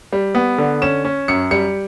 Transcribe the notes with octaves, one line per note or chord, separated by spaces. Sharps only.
G3
B3
D3
C#4 E7
C#4
F#2 C#7
G3 C#7